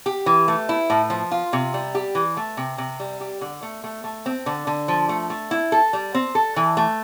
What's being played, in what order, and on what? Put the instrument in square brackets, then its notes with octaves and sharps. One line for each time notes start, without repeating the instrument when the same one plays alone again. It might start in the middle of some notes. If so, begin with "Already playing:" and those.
[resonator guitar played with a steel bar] G4
E3
A3
E4
A2
F3
F4
C3
G3
G4
E3
A3
C3
C3
G3
G4
D3
A3
A3
A3
C4
D3
D3
F3
A3
A3
E4
A4
G3
C4
A4
E3
A3